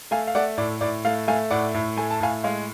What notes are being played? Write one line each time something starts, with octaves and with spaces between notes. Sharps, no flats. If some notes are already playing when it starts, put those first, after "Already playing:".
A3 F5 G#5
F5
A3 D5 F#5
A2 D5
A2 D5
A3 F5
A3 F5 G#5
A2 D5 F#5
A2
A3 G#5
A5
A2 F5 G#5
G#3 F5